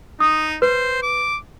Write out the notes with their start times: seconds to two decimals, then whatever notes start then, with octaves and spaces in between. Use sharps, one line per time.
0.20 D#4 D#6
0.62 B4 C5
1.03 D6